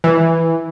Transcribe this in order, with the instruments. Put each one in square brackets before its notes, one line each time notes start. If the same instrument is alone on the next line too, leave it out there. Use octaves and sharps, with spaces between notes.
[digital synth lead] E3